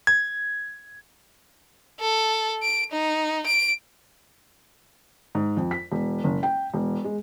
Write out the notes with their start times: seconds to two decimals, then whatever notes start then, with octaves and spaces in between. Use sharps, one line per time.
0.07 G#6
2.00 A4
2.63 D7
2.92 D#4
3.47 D7
5.35 G#2
5.57 F2
5.71 B6
5.92 E1
6.24 F#1
6.43 G5
6.74 E1
7.04 G#3